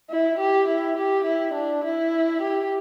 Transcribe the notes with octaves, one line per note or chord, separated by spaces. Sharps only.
E4
G4
E4
G4
E4
D4
E4
G4